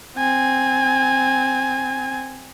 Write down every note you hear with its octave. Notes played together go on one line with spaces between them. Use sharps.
C4 G#5